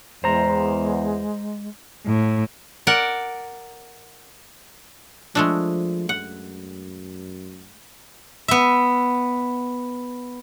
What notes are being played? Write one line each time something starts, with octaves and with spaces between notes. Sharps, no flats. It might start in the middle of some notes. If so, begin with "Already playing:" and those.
E2 G#3 C5 A#5
A2
A#4 D5 F#5
F3 G#3 A3 D4
F#2 F#5
B3 E5